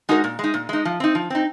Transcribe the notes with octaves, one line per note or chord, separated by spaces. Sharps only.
G#3 D#4 F#4 A#4
A#2
G#3 D#4
A#2
G#3 D#4
F3
C4 D#4
F3
C4 D#4